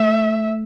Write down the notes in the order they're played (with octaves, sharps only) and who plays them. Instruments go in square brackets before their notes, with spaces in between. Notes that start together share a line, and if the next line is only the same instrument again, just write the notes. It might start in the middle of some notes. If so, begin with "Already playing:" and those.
Already playing: [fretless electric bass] A3 [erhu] E5